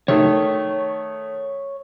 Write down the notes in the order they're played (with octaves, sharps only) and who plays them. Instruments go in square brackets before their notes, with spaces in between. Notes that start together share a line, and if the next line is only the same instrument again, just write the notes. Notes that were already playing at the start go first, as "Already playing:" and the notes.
[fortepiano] D#3 A3 [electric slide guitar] C#5